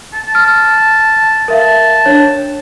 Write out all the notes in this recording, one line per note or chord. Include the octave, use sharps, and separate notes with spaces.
A5
F6
A#4 E5 F5 A5
D4 C#5